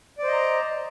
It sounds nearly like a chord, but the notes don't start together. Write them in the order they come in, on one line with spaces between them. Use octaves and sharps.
D5 C5 D#5 A#5